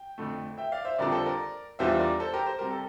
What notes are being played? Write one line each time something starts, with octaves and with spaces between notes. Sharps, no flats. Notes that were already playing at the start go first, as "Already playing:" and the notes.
Already playing: G5
F2 D3 A3
E5 G5
D5 F5
C5 E5
F2 D3 G3 D4 F4 A#4 D5
A4 C5
A#4 D5
E2 E3 G3 D4 F4 C5 E5
A#4 D5
A4 C5
G4 A#4
C5
C3 G3 A#4
A4